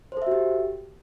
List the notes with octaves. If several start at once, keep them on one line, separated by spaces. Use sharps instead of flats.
F#4 G4 A4 C5 E5